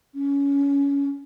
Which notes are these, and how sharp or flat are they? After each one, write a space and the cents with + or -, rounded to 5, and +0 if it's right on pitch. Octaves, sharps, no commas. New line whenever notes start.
C#4 +20